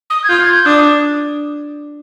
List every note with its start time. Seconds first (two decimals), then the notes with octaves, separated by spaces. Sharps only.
0.10 D#6
0.24 G#6
0.29 F4 G6
0.41 G#6
0.53 G6
0.65 D4 D#6
0.78 D#6